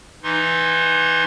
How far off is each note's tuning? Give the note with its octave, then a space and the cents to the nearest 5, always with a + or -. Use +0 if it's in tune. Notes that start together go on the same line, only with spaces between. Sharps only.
E3 +0 D#4 +0 C6 +20